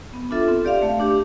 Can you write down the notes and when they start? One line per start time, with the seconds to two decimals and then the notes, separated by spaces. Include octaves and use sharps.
0.13 B3
0.31 D4 F4 A4 E5
0.48 C4
0.65 G4 D5 F5
0.82 A3
1.00 D4 G4